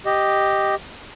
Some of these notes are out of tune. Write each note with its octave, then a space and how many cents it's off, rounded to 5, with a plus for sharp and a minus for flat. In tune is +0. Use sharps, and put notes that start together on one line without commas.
G4 +0 D#5 +0